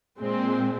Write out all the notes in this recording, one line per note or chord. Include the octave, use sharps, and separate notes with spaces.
A#2 G#3 C4